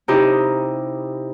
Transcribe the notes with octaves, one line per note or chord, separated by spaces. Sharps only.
C3 D#4 E4 G4